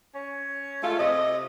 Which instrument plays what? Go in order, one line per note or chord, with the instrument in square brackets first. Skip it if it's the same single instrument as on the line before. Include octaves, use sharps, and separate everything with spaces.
[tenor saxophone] C#4
[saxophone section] G#3 A3 F4 [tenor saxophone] A4
[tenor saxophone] C3 [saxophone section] D#5